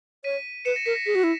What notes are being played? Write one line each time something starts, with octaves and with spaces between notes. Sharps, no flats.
C#5 B6 D#7
B4 C#7 E7
A#6 C#7
A#4 B6
A#6
G#4 B6
F#4
E4